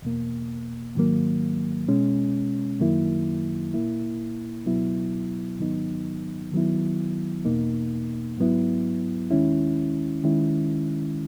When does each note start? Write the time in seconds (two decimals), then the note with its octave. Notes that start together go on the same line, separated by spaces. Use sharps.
0.02 E2 B2 A#3
0.95 G#2 D#3 F#3 A#3
1.88 B2 G#3 C#4
2.80 F#2 D#3 F#3 A#3 E4
3.74 A#2 A#3 E4
4.66 C#2 B2 F#3 B3 E4
5.59 G#2 D#3 F#3 B3 D#4
6.52 D#3 F#3 B3 E4
7.45 E2 B2 A#3 D#4
8.38 G#2 F#3 B3 E4
9.31 D#2 D#3 G#3 C#4 E4
10.23 D#3 G#3 C#4 E4